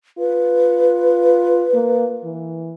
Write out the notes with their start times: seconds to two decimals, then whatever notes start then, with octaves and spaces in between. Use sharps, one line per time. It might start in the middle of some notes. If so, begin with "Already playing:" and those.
0.19 F4 B4
1.74 A#3
2.24 E3